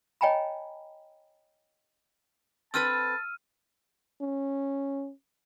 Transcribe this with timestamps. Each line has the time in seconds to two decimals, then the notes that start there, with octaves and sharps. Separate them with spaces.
0.21 C#5 D#5 G5 G#5 A#5 B5
2.74 C4 A4 B4 A5 E6 F6 D#7
4.21 C#4